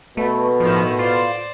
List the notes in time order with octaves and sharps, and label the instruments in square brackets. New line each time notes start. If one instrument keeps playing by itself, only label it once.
[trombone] B2 [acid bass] A3 [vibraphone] A4 B4 B5
[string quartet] A2 D#3 E4 [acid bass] F3
[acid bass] F4 [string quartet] C5 D5